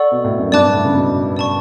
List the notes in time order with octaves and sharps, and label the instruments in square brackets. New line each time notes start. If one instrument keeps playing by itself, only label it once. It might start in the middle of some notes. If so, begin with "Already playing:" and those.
Already playing: [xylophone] A4 D5 F#5 C#6 E6
[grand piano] B2
A2
F#2
[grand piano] G2 [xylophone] D5 A5 D6 F#6
[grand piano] A2
C#3
B2
[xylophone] D5 A5 C#6